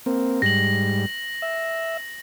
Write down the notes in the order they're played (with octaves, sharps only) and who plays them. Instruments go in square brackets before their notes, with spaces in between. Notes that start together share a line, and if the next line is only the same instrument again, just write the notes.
[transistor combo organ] A#3 C4
[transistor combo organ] G#2 G3 [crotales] A#6 F#7
[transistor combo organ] E5